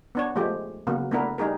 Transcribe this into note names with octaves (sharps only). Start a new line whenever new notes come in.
B3 D4 C#5
F3 G#3 A3 G4
C#3 F#3 A#3 B3
A3 B3 D4 E4 A#4
G3 D#4 G#4 A#4